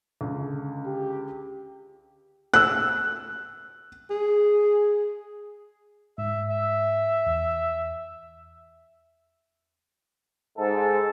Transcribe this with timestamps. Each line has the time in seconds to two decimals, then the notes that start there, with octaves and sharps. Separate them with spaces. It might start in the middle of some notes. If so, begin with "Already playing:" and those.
0.21 C#2 D3
0.86 G4
2.54 E6 F#6
4.10 G#4
6.18 G#2 E5
6.50 E5
7.26 E2
10.57 G#2 A4